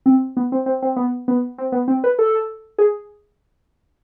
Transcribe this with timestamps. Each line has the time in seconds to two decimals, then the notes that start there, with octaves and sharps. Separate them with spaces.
0.06 C4
0.37 B3
0.52 C4
0.66 C4
0.82 C4
0.96 B3
1.28 B3
1.58 C4
1.72 B3
1.88 C4
2.04 B4
2.19 A4
2.79 G#4